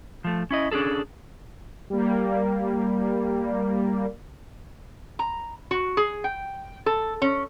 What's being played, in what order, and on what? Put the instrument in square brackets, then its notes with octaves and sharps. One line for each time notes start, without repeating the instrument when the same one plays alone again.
[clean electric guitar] F3 A3
C#4 E4 D#5
C#4 D4 F4 G#4 A4
[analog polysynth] G3 A#3
[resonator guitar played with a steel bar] A#5
F#4
G#4
G5
A4
C#4